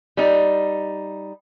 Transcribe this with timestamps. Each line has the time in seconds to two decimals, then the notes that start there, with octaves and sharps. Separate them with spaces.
0.17 G3 D#4